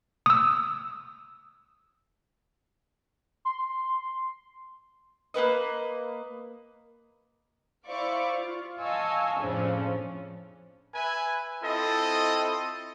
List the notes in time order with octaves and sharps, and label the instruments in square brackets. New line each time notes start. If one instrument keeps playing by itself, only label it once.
[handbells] D#6 E6
[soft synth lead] C6
[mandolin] A#3 B3 B4 D#5
[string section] E4 C5 D5 F5 C#6 D6
F4
D#5 F5 G#5 A5 C#6 E6
F2 A2 C#3 F3 C#4 D4
[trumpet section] B4 E5 G#5
C4 E4 F4 A4 D#5